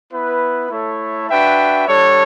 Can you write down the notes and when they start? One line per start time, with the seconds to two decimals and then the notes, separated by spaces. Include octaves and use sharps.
0.12 B3 E4 B4
0.70 A3 E4 A4 C#5 E5
1.29 D4 F#4 B4 E5 G5
1.87 G3 D4 A4 C#5